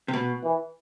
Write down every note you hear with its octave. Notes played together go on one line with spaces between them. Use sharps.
C3
B2
E3